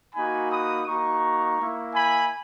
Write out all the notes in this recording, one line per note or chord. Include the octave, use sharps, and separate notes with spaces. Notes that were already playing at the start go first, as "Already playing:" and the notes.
A#3 D#4 F#4 G#5 B5
B5 D#6
A#3 D#4 F#4 A#5 C#6
A#3 E4
G#5 B5